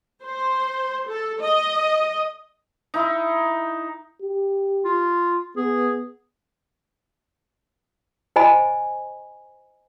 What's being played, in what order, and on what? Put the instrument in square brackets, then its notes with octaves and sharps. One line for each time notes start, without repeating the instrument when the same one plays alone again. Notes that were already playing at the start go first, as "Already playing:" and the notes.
[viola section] C5
A4
D#5
[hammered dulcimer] D#4 E4
[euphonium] G4
[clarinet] F4
[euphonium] B3 [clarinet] G#4
[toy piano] C5 D#5 G#5 B5